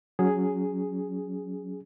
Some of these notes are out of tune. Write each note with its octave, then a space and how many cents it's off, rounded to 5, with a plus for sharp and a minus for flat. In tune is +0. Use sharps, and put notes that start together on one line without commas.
F#3 -5 C#4 +15 G#4 +0